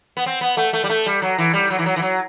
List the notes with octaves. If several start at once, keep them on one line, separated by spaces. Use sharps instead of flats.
B3
C4
B3
A3
A3
G3
A3
G3
F#3
E3
G3
F#3
E3
F#3
E3
F#3